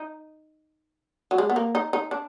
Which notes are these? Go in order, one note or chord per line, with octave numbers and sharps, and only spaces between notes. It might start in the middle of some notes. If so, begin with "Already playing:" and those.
Already playing: D#4
F#3
G#3
B3
A#3
D#4
D#4
D4